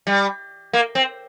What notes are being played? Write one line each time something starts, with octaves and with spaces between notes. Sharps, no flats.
G3
A#3
C4